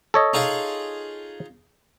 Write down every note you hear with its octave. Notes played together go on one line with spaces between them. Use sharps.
A4 C#5 D#5
D#4 F4 G#4